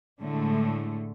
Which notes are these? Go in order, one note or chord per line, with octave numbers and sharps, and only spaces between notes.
A2 D3 G#3 A3